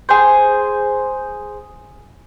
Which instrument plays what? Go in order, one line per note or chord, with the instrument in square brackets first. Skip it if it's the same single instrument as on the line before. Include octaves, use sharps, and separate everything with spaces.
[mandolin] G#4 C5